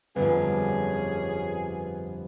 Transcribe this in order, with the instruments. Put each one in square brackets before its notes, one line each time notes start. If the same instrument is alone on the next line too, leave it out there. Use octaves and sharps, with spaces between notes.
[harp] G1 F2 [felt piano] B3 [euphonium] C#4 [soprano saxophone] G#4